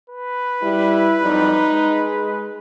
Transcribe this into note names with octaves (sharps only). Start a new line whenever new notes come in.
B4
G3 E4
F2 F#3 G3 D#4
G#3